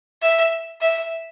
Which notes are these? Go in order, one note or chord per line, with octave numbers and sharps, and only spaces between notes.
E5
E5